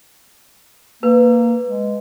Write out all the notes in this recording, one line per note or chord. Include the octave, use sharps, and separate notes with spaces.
A#3 B4
G#3